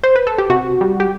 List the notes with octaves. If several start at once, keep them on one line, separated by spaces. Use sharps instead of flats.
C5
B4
A4
G4
C3 F#4
G3
G4